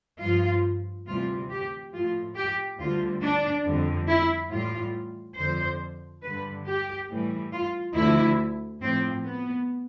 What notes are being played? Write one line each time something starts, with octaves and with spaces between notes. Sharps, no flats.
G2 F3 F4
D2 C3 E3 G3 F4
G4
A2 F3 F4
G4
D2 D3 G3 F4
D4
F2 D3 G3
E4
A2 E3 G3 F4
F2 D3 F3 C5
G2 D3 G3 B4
G4
A2 E3 G3
F4
D2 D3 F3 E4
A2 F3 C4
B3